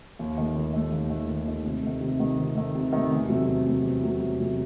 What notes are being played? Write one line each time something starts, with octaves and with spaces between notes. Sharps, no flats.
D#2
D#3 A3
D#2
D#3 A3
D#2
D#3 A3
D#2
D#3 A3
C3
D#3 A3
C3
D#3 A3
C3
D#3 A3
C3
D#3 A3
E2
C3 F#3 A3
E2
C3 F#3 A3
E2
C3 F#3 A3
E2
C3 F#3 A3